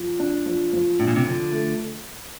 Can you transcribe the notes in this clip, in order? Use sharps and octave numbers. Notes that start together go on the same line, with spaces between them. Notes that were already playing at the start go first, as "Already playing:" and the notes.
Already playing: F3
D4
F3
F3
A2 D4
A#2
C3
D3 F3
A3